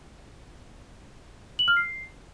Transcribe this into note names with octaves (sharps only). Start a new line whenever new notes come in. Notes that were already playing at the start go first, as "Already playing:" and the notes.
F#7
F6
C7